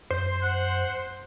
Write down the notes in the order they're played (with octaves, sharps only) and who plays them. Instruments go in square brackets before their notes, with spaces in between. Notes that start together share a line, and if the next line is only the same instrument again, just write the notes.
[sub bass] F#2 [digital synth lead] C5
[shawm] F#5